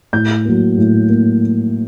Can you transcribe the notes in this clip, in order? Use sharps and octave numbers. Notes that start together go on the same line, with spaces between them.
A2 G6
F#3 A#3
A2
A#3